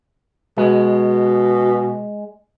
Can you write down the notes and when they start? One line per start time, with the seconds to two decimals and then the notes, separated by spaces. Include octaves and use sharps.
0.57 B2 G#3